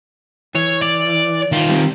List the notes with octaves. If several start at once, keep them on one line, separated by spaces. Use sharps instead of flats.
E3 C#5
D5
D#3 F4
G3 C4